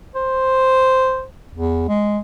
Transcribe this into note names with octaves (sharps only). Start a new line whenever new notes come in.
C5
E2
G#3